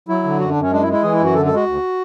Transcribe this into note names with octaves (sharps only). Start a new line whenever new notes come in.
F#3 E4
D3
F#2 F#4
D4
F#2
C#4
G#3 D4
E4
G#3
E4
E3 G#4
E4
F#2
F#4
D3 A4
A4
G#3
F#4
D2